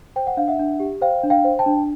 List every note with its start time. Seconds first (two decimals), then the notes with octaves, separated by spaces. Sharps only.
0.16 C5 G5
0.27 F#5
0.37 D4 F5
0.48 E5 F#5
0.59 D4
0.80 G4
1.01 C5 F5 G5
1.23 D4
1.30 F5 G5
1.45 C5
1.59 G5 A5
1.66 D4